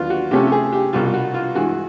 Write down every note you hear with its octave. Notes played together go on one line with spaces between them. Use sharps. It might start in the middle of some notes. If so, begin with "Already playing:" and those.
Already playing: D#2 D3 F#3 B3 D4 F4
F#4
C3 F3 A3 C#4 G4
G4
G#4
G4
C2 B2 G3 F4
F#4
F4
G2 E3 G#3 F#4